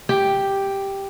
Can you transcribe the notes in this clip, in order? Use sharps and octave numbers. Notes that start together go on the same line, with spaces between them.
G4